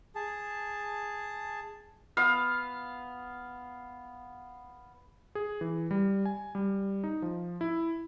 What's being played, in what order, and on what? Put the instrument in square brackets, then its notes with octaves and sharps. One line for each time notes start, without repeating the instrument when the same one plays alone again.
[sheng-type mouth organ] G#4 A5
[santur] B3 F5
[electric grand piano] G#4
E3
G3
G#5
G3
D#4
F3
E4